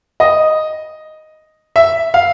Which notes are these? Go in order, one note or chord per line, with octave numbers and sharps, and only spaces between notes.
D#5
E5
F5